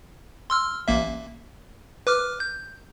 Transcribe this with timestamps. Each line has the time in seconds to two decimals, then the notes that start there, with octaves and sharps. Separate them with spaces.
0.50 C6 E6 F6
0.88 A1 A#3 E5
2.07 B4 D6 F6
2.40 G6